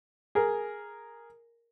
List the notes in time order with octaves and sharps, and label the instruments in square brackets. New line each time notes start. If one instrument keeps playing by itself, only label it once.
[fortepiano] G#4 A#4